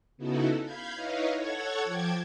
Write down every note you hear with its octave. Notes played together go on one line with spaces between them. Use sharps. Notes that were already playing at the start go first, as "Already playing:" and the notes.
C#3 B3 D#4 E4 F#4 A4
F5 B5 G6 G#6
D#4 E4 B4 C#5 D#5 F5
A4 C#5 F#5 C#6 G#6
F3 G5 A5 D6 G#6